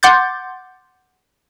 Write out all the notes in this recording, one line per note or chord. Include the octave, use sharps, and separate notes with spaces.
F#5 C6 D6 G6 A6